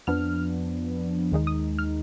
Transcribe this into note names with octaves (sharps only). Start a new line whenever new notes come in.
F2 F3 B3 D4 F6
D#2 D#3 G#3 D#4
D#6
F6